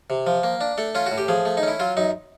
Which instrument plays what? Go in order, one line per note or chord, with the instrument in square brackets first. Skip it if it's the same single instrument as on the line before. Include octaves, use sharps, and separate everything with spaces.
[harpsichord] C3
F3
A#3
D4
A3 A4
C#4 F4
F#4
A2
G4
F3 G#4
A3
D#4
C#4 E4
F#3 F4
F#2 D#4